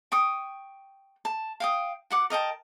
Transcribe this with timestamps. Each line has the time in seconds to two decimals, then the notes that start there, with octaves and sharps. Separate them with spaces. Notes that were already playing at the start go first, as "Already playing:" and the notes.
0.12 G5 C#6 D#6
1.25 A5
1.60 F5 G5 D#6
2.10 F#4 F#5 D6
2.30 A#4 D#5 G5 A5